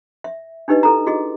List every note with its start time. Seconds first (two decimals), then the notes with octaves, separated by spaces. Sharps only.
0.24 E5
0.68 D4 D#4 G4 B4 D#5
0.83 E4 A4 A#5
1.06 E4 F#4 G#4 D#5